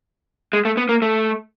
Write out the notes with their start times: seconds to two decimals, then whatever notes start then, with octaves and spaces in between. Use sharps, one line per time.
0.53 G#3
0.65 A3
0.77 B3
0.89 A#3
1.02 A3